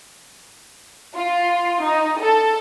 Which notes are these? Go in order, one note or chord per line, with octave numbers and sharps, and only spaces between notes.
F4
D#4
A4